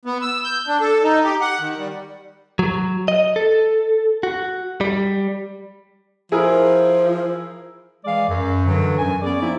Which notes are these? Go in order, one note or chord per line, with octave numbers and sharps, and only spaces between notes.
B3
E6
G6
D4
A4
D#4
G4
F#5
D#3
G3
F#3
D#5
A4
F#4
G3
F3 E4 G#4 A#4
E3 G#3 G#4 D5 F5
F#2
G2 B2 D3 E3 F#3
F#2 G#5
B3 C#4 G#4 D5
F3 A#3 C4 D#4 E4